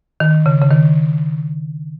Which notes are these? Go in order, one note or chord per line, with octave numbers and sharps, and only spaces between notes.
D#3
C#3
C#3
D#3